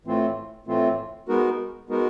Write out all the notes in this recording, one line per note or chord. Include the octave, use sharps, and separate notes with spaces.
A2 E3 A3 C4 F4
A2 E3 A3 C4 F4
G#3 B3 D#4 F#4 A#4
G#3 B3 D#4 F#4 A#4